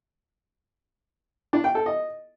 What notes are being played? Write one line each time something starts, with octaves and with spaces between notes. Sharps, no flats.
D4
G5
A4
D#5